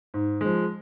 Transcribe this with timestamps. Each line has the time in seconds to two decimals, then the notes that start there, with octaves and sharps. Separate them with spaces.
0.14 G#2
0.41 F3 G#3